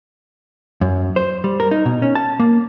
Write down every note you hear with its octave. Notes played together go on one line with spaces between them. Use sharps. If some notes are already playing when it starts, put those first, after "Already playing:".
F#2
C5
G3
A#4
D#4
B2
C#4
A5
A#3